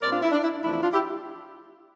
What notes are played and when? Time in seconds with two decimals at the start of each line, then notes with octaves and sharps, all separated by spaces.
0.01 A#2 G3 C4 A#4 D5
0.12 D4 F4
0.22 E4
0.31 D4
0.43 E4
0.63 E2 C3 F3 A3 D4 E4
0.73 E4
0.82 D4 F4
0.93 E4 G4